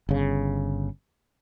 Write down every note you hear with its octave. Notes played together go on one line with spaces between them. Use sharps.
G1 C#3